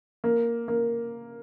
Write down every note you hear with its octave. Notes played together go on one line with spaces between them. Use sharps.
A#3
A#3